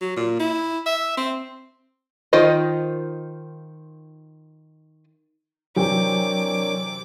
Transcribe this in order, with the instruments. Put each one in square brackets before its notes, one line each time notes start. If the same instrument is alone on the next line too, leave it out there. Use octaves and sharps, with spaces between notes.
[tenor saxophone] F#3
A#2
E4
E5
C4
[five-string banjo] D#3 F4 C5 D#5
[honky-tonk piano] C3 E3 G5 [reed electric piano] F#3 [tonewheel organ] D4 A#4 C#5 [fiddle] D6